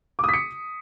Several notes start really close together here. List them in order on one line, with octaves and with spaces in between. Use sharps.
D6 D#6 B6 C#7